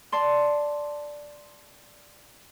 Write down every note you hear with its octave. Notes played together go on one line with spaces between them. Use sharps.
D5 A5 C6